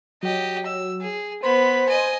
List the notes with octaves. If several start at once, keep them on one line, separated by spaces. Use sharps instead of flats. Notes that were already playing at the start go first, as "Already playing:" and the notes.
F#3 G4 D#5
E6
G#4
B3 C5 B5
D#5 G#5